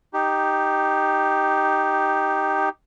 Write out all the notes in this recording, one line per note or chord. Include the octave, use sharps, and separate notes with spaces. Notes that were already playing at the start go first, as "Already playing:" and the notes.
D#4 G4